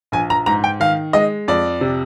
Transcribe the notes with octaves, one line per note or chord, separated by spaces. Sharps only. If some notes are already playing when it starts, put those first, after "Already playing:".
A#1 G#5
A#5
G#2 A#5
G5
D#3 F5
G#3 D#5
F2 D5
C3